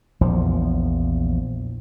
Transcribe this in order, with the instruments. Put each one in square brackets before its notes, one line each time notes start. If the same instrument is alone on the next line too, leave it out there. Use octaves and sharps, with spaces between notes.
[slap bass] A#1 E2 F3